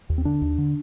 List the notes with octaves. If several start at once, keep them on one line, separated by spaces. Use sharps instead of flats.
D#2
C4
D3 D4
D#2
D3